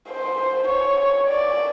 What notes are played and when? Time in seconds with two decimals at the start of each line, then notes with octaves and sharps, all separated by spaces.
0.09 C5
0.68 C#5
1.27 D5